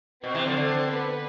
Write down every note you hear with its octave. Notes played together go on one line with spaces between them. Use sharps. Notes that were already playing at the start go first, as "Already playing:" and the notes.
B2 C4 C5
C3 E3
D3 F3
D3
B3 B4